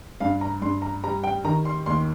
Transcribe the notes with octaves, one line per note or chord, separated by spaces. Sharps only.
G2 F5
A#5
G2 C6
A#5
G3 A#5
G5
D#3 A#5
C6
D#2 C6